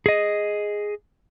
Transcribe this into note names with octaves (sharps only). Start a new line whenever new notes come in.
G#4 D#5